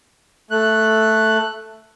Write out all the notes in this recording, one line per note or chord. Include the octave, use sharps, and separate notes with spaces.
A3 F#6